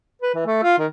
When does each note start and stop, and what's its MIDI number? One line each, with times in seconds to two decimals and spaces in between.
0.22 0.33 71
0.34 0.42 52
0.46 0.60 57
0.63 0.75 65
0.78 0.86 51